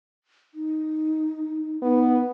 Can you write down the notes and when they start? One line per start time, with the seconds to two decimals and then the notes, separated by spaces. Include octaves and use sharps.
0.54 D#4
1.82 B3 D#4